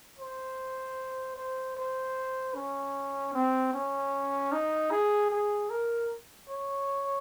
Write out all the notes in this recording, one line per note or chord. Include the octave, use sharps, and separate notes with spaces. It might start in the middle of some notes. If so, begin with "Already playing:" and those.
C5
C5
C5
C#4
C4
C#4
D#4
G#4
G#4
A#4
C#5